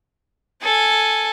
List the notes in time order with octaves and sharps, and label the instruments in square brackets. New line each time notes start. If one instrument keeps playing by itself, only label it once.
[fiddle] A4 G#5